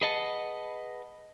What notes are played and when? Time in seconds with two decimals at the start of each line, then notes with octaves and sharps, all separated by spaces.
0.01 G#4 B4 D#5 F#5 A5